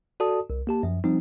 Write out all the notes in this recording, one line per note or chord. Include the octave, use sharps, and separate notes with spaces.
F#4 A4 D5 A5 D#6
C2
A#3 G4 A5
F#2 F3
F3 G3 C4 D#4